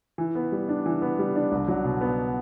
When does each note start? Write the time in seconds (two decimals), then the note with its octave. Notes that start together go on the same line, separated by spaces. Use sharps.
0.18 E3
0.35 B3
0.52 G3
0.69 D4
0.86 E3
1.02 B3
1.19 G3
1.36 D4
1.52 C2
1.68 F#3
1.84 B2
2.01 B3